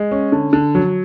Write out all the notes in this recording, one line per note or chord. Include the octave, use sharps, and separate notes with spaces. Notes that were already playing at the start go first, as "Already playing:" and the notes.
Already playing: G#3
C#4
D3
D3
F#3